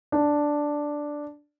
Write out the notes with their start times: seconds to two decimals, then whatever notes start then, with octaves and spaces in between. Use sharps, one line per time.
0.12 D4